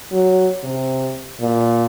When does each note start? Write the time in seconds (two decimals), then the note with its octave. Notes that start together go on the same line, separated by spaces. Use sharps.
0.12 F#3
0.64 C3
1.40 A#2